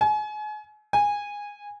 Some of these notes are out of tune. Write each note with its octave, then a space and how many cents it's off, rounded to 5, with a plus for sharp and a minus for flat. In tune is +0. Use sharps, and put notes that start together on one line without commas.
G#5 +35
G#5 -15